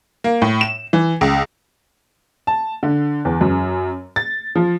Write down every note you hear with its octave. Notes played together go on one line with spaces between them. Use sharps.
A#3
A2
E7
E3
C#2
A5
D3
E2
F#2
A6
F3